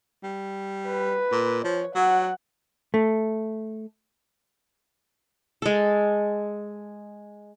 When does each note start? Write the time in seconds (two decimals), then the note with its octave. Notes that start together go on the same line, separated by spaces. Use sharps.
0.24 G3
0.87 B4
1.32 A#2
1.64 F3 C#5
1.95 F#3 F#5
2.94 A3
5.62 G#3 A4